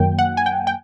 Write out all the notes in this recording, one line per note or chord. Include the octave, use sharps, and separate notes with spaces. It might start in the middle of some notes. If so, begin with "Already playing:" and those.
Already playing: F#2 D#3 F#3 A#3 G5
F#5
G#5
G5
G5